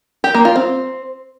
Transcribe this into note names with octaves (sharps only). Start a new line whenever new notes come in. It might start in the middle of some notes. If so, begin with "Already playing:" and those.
G4
A#3
F4
C4